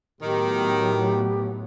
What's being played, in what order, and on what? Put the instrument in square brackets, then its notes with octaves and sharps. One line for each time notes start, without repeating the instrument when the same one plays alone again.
[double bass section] A2 F#3 B3 [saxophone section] D#3 [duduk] G4